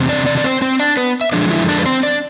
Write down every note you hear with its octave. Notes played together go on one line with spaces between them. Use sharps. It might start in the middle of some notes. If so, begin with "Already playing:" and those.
Already playing: E2 C3
D4 D5
D4 D5
D5
C4 C5
C4 C5
D4 D5
B3 B4
E5
D3 F3 G#3 D4 D5
E4 E5
D4 D5
B4
C4 C5
D4 D5